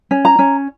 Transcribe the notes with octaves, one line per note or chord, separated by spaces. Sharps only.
C#4
A#5
C#4